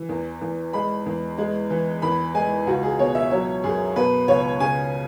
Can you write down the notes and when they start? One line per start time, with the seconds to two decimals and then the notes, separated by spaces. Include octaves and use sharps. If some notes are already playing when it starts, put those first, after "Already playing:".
Already playing: E3
0.09 E2
0.41 E2
0.73 G#3 B5
1.06 E2
1.38 G#3
1.70 E3
2.02 E2 B5
2.35 G#3 G#5
2.67 C#2 F#4
2.83 G#4
2.99 B2 C#5
3.15 E5
3.31 F#3 C#5
3.64 F#2 G#4
3.96 B2 B4
4.28 C#2 C#5
4.60 C#3 G#5